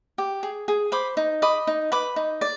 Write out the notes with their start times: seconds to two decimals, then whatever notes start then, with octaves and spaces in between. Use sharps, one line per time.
0.18 G4
0.43 G#4
0.68 G#4
0.92 C5 B5 D6
1.17 D#4
1.42 D#5 B5 D6
1.67 D#4
1.92 B4 B5 D6
2.16 D#4
2.41 D5